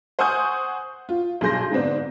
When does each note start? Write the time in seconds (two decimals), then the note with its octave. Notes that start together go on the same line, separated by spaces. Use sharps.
0.19 C5 F#5 G#5 C#6 D#6 G6
1.09 F4
1.41 B1 G2 G#4 C6 G6 A#6
1.71 G#2 D3 B3 C4 D4